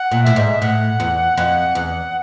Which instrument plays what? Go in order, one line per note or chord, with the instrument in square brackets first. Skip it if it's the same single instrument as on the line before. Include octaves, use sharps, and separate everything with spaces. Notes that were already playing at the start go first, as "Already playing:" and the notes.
Already playing: [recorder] F#5
[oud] A#2
[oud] A2 [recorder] E5
[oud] G#2
[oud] A2 [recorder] F#5
[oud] E2
F2
E2